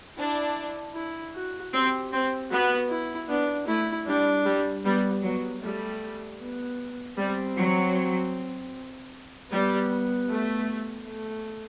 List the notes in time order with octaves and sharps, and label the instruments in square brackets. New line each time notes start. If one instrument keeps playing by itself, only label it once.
[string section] D4 [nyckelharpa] E4
[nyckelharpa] E4
F#4
[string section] C4 [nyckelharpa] G4
[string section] C4
[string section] B3 [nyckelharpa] F#4
[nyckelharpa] E4
[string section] B3 [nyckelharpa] D4
[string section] A3 [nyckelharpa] E4
[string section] G3 [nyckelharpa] D4
[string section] G3
[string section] G3 [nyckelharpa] B3
[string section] F#3 [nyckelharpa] B3
[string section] G3 [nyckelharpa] A3
[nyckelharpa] B3
[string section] G3 [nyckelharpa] C4
[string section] F#3
[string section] G3 [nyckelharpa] B3
[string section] A3
[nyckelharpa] A3